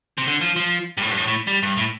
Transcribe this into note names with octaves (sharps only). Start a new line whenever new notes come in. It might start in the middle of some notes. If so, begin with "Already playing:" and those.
C3
D3
F3
F3
G2
A2
G2
A2
A2
G3
G2
A2